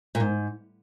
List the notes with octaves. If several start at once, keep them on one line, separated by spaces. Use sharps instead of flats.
A#2
G#2